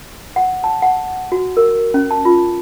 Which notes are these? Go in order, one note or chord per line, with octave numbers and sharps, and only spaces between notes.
F#5
A5
F#5
F#4
A#4
C#4
A5
F4